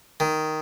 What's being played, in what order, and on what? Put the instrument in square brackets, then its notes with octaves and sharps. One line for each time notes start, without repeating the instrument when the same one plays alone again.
[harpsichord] D#3